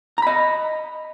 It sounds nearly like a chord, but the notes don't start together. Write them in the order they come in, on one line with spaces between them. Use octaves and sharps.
A#5 B5 D#5